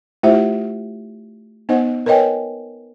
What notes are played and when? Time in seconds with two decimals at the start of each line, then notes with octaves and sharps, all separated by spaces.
0.23 A3 E4 F4 G4 C5 E5
1.69 B3 D#4 C5 D#5 F#5
2.06 A#4 B4 C#5 D#5 G5 G#5